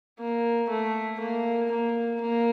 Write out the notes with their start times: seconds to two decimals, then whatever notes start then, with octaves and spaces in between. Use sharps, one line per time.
0.19 A#3
0.69 A3
1.20 A#3
1.71 A#3
2.21 A#3